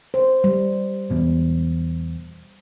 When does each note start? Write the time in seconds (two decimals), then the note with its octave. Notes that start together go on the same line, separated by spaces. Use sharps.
0.14 C5
0.44 G3
1.10 E2 B2